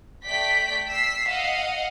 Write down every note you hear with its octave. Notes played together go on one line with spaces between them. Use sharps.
A3 D5 G5 B6
E6 B6 C7
D#5 F5 F#5